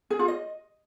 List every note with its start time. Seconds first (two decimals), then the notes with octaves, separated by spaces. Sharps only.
0.10 G#4
0.19 F4
0.28 D#5